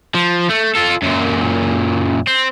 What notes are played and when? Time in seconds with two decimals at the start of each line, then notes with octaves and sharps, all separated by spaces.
0.14 F3
0.50 A3
0.76 F4 A4
1.03 F#2 A#2
2.27 C4